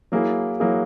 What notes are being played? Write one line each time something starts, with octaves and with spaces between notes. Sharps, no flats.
F#3 A#3 E4 G#4
F#3 A#3 E4 G#4